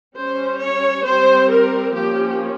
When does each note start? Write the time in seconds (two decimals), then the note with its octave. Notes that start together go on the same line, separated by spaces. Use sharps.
0.17 G3 C#4 C5
0.61 C#5
1.05 G3 C4 C5
1.50 A#4
1.95 F3 A#3 C#4 G4